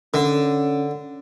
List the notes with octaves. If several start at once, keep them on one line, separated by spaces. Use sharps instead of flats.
D3 C#4